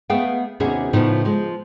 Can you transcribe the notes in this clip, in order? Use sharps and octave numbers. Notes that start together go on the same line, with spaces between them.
A3 B3 G#4 B4 F5 G5
D#2 C3 B3 C#4 F#4 G#4
A2 C#3 F3 B3 D#4
F3 G#3